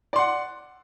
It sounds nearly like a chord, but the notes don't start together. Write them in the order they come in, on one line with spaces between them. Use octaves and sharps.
D5 C6 F#5